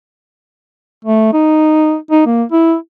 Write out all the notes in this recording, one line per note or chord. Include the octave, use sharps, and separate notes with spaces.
A3
D#4
D#4
A#3
E4